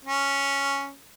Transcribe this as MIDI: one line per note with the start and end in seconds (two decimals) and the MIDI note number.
0.05 0.94 61